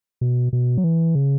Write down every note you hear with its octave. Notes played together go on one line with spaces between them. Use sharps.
B2
B2
F#3
E3
C#3